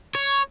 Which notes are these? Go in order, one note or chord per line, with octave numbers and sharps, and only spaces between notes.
C#5